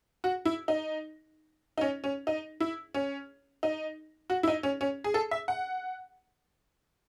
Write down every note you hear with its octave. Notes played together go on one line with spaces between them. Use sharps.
F#4
E4
D#4
D#4
C#4
C#4
D#4
E4
C#4
D#4
F#4
E4
D#4
C#4
C#4
G#4
A4
E5
F#5